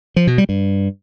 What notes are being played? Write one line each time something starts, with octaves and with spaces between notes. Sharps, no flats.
F3
B2
G3
G2